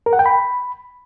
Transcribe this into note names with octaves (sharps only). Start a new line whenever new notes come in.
A#4
F#5
G5
B5